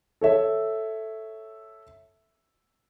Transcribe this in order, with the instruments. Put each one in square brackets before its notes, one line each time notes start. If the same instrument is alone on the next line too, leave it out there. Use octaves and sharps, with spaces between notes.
[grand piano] A4 C#5 E5